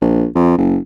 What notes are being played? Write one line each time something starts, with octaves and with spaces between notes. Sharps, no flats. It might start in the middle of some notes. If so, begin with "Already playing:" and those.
A#1
F2
F#1